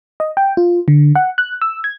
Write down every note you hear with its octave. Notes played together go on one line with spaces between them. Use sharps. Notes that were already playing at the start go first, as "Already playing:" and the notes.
D#5
G5
F4
D3
F#5
F#6
E6
G#6